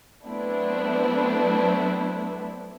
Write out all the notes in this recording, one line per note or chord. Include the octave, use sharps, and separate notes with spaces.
F#3 A3 B3 C4 D4 E4